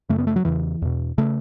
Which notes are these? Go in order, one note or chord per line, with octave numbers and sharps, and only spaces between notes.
F#2 C#3 A3
B3
A3
F#3
E2 C#3 E3
E2 B2
C#3 A3